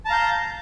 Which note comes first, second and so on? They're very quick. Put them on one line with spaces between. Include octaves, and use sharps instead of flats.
A5 A#5 F5 G6